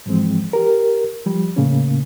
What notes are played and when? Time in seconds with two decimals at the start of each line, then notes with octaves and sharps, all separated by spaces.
0.06 G#2 E3 F3 G#3 C4
0.53 G4 A#4
1.26 F3 G3
1.56 A2 C#3 A3 A#3 C#4